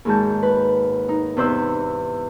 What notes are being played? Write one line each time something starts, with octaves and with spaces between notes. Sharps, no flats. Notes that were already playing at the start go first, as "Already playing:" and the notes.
D#2 G#2 G#3 F#4 A5 G6
B4
D#4
E2 C3 B4 C5 B5 E6